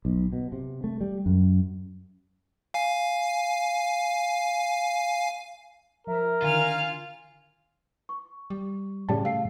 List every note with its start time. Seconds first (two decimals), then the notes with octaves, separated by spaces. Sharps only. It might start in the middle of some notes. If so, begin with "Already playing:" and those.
0.05 B1
0.33 B2
0.52 C3
0.84 A3
1.01 G3
1.26 F#2
2.74 F5 G#5
6.07 F3 A#4 E5
6.42 D3 D#3 F4 G#5 F6
8.09 C#6
8.50 G3
9.09 A2 C#3 G3 A5
9.25 A3 F5 G5 C7